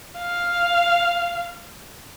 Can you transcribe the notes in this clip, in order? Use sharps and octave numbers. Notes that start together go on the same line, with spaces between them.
F5